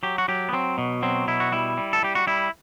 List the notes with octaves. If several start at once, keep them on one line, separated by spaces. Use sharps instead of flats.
F#3 G4
F#4
F#3 G4
B3
F#3 C4
B2
F#3 C4
B2 E4
F#4
G3 E4
G3
A4
G3 G4
F#4
G3 E4